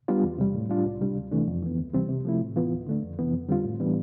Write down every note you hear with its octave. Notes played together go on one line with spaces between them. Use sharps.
G3 B3 D4 F4
E2
C3 G3
A2
G3 D4 F4
C2
C3 G3 D4
D2
C3 E3 A3 D4
F2
E3 B3
D2
C3 E3 G3 C4
C3
F3 A3 E4
A2
E3 B3 F4
D2
D3 A3 D4
F2
C3 E3 B3
F2
D3 G3 C4 F4
A2
E3 G3 B3 D4